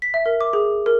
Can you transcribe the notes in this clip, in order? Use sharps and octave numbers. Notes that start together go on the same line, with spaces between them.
B6
E5
A#4
D6
G#4
A#4